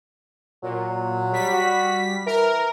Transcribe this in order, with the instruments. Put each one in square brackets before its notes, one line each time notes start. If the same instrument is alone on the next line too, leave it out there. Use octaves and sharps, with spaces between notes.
[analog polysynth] A#2 [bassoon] F#3
[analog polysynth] G3 B6
[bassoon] F#4
[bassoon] E3 [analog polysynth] A#4